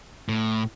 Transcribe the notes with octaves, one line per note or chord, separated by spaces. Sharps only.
A2